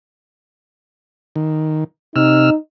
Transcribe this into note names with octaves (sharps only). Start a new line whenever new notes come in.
D#3
C3 D#4 E6 F6